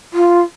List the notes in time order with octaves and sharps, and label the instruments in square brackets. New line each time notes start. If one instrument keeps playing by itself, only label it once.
[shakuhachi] F4